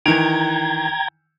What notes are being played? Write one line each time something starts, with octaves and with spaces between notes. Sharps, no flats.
D#3 E3 G5 A#5 G#6